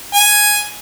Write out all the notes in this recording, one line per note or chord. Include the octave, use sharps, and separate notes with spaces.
G#5